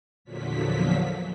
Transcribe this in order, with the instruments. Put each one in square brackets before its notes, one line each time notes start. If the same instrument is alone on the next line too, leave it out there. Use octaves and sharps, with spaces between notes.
[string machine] E2 A#2 D3 F3 F#3 B6